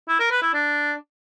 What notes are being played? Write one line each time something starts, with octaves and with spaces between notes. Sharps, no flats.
E4
A#4
B4
E4
D4